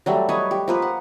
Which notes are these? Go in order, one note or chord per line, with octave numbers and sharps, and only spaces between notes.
F#3 G3 A3
B4 C#5 D#5
G4
F3 A#3 B4
F#5